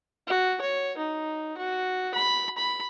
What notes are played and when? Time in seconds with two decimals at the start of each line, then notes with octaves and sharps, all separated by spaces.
0.27 F#4
0.61 C#5
0.98 D#4
1.57 F#4
2.15 B5
2.58 B5